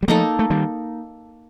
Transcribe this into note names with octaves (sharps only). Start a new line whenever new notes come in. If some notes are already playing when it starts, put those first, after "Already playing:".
G3
F3 A3 A#3 D#4 A4
A3
D#3 G3